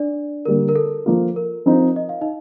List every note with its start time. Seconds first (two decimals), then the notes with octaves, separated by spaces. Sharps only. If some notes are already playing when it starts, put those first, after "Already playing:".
Already playing: D4 D5
0.45 D3 G3 A#3 A#4
0.69 A#4
0.75 A4
1.06 F3 A#3 F4
1.36 A#4
1.66 F3 C4 D#4
1.96 D#5
2.09 F5
2.21 D#4 D#5